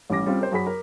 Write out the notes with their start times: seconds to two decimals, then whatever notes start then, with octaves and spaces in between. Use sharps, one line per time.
0.10 A1 G3 C#4 D6 A#6
0.26 G3 C4 C#4 F4
0.38 G4 A#4 C5
0.52 F#2 F#4 G#4 B5 B6
0.66 A#4